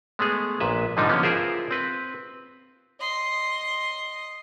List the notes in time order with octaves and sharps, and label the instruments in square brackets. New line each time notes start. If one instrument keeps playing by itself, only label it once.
[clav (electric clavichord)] G#3 A3 B3 G#4
A#1 A#2 B4 E5
G#2 D3 F3 G3 D4 D#4
D3 E3 F3 A#3 B3 C#4
E4 F4 G#4 A#4 C5 E5
C4 B4
[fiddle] D#5 C6